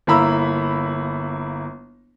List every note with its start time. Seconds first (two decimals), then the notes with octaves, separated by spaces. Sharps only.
0.07 G1 A#3 E4 A#5 B5 E6